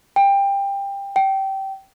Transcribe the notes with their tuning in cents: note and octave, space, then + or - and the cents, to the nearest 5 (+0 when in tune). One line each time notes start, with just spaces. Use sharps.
G5 +20
G5 -20